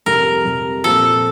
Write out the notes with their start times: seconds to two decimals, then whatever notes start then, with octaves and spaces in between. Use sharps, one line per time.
0.06 F2 C3 G3 A#4
0.45 F2 C3 G3
0.84 A#2 F3 C4 F4 A4